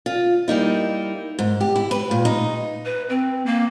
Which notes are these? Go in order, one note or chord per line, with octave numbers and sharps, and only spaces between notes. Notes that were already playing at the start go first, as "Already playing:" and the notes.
F4
G3 A#3 D#4 E4
G#2
G4
E4
B4
A#2
D#4
B4
C4
A#3